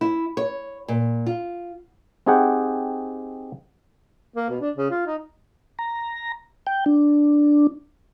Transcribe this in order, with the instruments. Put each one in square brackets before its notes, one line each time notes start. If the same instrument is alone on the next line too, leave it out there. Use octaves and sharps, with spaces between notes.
[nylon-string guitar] E4
C#5
A#2
F4
[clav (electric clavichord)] C4 D#4 G4 G#4 F#5 G5
[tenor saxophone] A#3
B2
D4
C#3
F4
D#4
[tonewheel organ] A#5
G5
D4